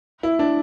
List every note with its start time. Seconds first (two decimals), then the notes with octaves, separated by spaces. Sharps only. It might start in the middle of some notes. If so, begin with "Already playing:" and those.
0.23 E4
0.39 D4